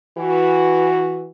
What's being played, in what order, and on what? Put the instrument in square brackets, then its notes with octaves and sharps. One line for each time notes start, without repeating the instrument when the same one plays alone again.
[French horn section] E3 F#4